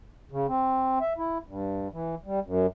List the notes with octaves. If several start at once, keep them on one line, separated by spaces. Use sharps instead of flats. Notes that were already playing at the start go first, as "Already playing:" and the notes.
C#3
C4
E5
E4
G2
E3
G3
F#2